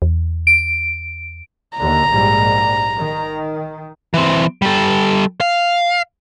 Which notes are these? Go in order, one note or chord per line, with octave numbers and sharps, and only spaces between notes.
E2
D7
D#2 D3 A#5
A#1 G#2 G3
D#3
E3 C4
G3 A4
F5